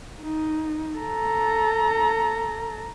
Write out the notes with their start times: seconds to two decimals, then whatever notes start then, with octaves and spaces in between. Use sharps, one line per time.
0.22 D#4
0.98 A4 A#5